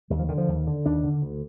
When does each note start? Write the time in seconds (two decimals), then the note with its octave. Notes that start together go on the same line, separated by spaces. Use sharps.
0.10 D#2 G3
0.19 F3
0.29 D3 D#3
0.38 F3
0.48 D#2
0.67 D3
0.86 D#2 D4
1.03 D3
1.22 D2